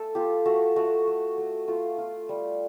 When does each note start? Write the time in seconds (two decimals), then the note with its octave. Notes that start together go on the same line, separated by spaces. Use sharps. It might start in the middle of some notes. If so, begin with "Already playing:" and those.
Already playing: A3 A4
0.15 F4 G4
0.46 A3 F#4
0.76 A3 F#4
1.07 A3
1.38 A3
1.68 A3 F4
1.98 F4
2.29 G3